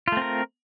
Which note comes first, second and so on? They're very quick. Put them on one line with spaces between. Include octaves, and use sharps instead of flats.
F4 A3 C4 A#4